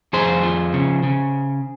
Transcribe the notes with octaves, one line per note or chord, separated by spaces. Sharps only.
F2 G#4 C5
F3
C#3
C#3